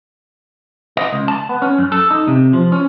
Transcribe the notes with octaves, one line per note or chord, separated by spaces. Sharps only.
D#5
C#2
A5
B3
C#4
F#2
A4
D#4
C3
F3
C#4